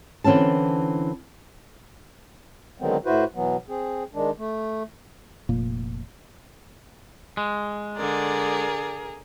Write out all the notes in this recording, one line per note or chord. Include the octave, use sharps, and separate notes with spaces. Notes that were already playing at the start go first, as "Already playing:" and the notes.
D3 E3 C4 C#4 A5
D3 D#3 F#3 G#3 B3 C4
A2 E4 F#4 B4 C5
B2 E3 F#3 B3
C4 G#4
D#3 G#3 D4
A3
F1 A#2 A#3
G#3
D3 G#4 A#4 D5